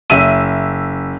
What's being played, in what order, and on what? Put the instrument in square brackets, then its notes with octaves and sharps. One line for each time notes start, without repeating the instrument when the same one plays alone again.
[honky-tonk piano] F#1 E5 E6 D#7